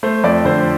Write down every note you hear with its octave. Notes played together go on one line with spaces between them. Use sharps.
A3 C5
F2 D5
D3 C5